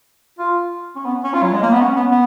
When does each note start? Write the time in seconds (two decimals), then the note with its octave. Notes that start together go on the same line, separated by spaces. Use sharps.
0.39 F4
0.96 C#4
1.05 B3
1.24 C#4
1.33 F4
1.43 F#3
1.53 G#3
1.62 A#3
1.73 B3
1.82 C#4
1.96 B3
2.11 B3